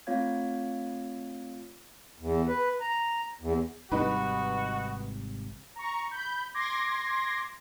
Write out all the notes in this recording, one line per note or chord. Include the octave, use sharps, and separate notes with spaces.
A3 C4 F4 C#5 F5 G#6
E2
B4
A#5
E2
G#1 C3 G3 D#4 F#4 B4
A#5 C#6
B5 G6
C6 D6 G#6 A#6